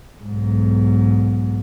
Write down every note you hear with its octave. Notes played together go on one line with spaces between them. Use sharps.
B1 G#2